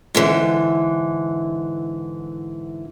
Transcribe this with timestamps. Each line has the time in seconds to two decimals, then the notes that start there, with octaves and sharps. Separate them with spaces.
0.15 G#2 D3 E3